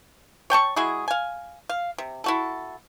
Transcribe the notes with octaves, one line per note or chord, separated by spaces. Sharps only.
C#5 G5 A5 C#6
G#3 E4 F#4 G#4
F5 G#5
F5
C3
E4 F#4 A4